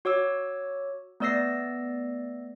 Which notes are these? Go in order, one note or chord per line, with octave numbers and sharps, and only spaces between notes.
F#4 C#5 D6 E6
A3 B3 D5 E6 A#6 C7